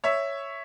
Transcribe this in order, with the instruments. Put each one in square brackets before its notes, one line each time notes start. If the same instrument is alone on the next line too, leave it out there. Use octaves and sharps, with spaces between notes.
[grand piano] C#5 E5